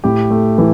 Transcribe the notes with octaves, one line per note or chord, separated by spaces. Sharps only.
A2 G4
A3
E3